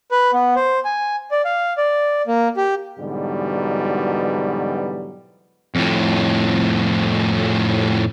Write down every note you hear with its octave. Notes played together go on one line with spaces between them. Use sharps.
B4
B3
C5
G#5
D5
F5
D5
A#3
G4
G#2 B2 D3 E3 F#3 G3
F2 A2